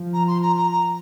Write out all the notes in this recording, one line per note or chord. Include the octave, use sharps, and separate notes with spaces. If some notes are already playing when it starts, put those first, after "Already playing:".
Already playing: F3
A#5
C6
A#5
A#5
A#5